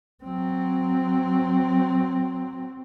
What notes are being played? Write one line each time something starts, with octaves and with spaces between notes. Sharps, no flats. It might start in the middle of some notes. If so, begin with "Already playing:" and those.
F#3 C4